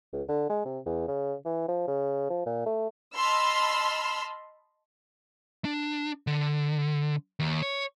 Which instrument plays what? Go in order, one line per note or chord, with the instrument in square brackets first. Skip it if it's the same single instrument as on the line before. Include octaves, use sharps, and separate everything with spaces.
[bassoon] C#2
D3
G#3
C3
E2
C#3
E3
F3
C#3
F3
A#2
A3
[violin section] D#5 A5 B5 C6 E6 F6
[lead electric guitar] D4
D3
D#2
C#5